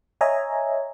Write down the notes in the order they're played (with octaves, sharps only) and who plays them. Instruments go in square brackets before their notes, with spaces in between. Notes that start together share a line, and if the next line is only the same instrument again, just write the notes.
[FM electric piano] C#5 D#5 E5 G#5 A#5